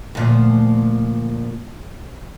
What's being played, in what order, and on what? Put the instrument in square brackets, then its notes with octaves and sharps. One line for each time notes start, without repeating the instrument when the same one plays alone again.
[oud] D2 A#2 F3